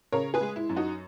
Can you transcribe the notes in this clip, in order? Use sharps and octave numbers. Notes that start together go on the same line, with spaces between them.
C#3 A#4 C#5
G#4 B4
G#3
E4
F#2
D#4 F#4